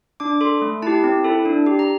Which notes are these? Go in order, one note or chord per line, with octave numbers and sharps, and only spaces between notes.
D4 D6
A4 C6
A3
E4 G4 A5
C4
E4 A4
D4
G4
A#5